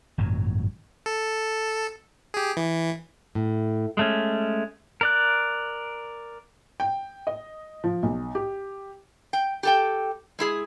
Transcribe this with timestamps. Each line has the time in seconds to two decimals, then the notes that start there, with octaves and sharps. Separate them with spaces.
0.18 G#1 F#2 A#2 F#3
1.06 A4
2.34 G4 G#4
2.57 E3
3.35 A2
3.97 G#3 A3 C#4
5.01 A#4 D5 F#6
6.80 G5
7.27 D#5
7.84 F3
8.03 B1
8.35 G4
9.33 G5
9.63 G4 A4 G5
10.39 G#3 E4 G#4